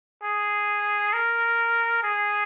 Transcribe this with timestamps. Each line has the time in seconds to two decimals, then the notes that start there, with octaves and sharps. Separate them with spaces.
0.23 G#4
1.13 A#4
2.03 G#4